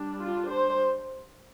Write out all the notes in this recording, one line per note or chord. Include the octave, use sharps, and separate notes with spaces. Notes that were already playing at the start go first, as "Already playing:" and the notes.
Already playing: G3 D4
F4
C5